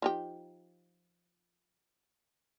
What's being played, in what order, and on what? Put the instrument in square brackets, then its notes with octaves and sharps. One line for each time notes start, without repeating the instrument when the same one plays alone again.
[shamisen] F3 D#4 G4